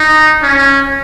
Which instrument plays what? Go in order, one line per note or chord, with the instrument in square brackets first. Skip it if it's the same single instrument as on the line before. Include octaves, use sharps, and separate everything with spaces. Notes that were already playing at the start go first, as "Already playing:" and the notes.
Already playing: [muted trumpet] D#4
C#4